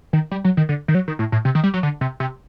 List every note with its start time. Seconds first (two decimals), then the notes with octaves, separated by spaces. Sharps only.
0.13 D#3
0.31 G3
0.45 F#3
0.57 D#3
0.69 D3
0.88 D#3
0.95 F#3
1.08 D#3
1.19 A2
1.32 A2
1.45 C3
1.55 D#3
1.64 G3
1.74 F#3
1.83 D3
2.01 C3
2.20 C3